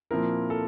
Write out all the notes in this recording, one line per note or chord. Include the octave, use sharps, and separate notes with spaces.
A#2 F3 C4 E4 A#4
A4